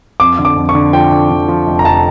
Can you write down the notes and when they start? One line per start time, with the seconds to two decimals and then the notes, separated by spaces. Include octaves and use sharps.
0.20 F2 D6
0.39 D3
0.45 D6
0.56 F2
0.69 C#6
0.75 D3
0.93 F3 G5
1.12 D3
1.30 D3
1.48 F3
1.67 F1
1.79 A#5
1.85 F1 A5